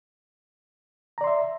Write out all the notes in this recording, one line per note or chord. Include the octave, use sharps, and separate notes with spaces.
D5 E5 A#5 C6